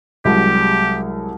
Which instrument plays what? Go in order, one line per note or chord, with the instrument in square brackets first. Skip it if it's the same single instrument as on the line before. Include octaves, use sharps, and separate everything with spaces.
[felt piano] C2 F#3 G#3 [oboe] G4